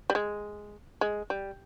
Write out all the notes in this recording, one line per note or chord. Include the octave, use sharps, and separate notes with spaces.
G3
G#3
G#3
G3